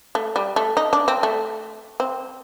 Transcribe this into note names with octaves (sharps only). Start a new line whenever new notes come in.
A3
G3
A3
D#4
D4
C4
A3
C4